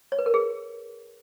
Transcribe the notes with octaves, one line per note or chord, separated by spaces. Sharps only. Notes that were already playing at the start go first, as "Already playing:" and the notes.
C#5
B4
A#4
G#4